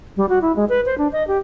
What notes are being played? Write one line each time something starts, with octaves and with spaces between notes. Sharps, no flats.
G3
F#4
E4
G#3
B4
C5
D4
D#5
G4